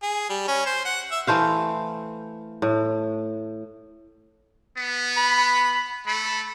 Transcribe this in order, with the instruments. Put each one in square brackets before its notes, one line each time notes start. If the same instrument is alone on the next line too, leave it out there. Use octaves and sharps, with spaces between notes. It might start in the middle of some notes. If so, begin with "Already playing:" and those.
[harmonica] G#4
G3
C#4
C5
F#5
E5
[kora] E3 A3 C5 F5
A2
[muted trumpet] B3
[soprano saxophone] B5
[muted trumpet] A3 [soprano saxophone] B5